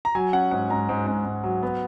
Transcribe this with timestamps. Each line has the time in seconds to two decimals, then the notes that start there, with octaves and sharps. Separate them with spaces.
0.05 A#5
0.15 F#3 G#5
0.33 C#4 F#5
0.51 G#2 F#5
0.70 G#2 A#5
0.89 G#2
1.07 G#2
1.25 G#2
1.44 F#3
1.63 B3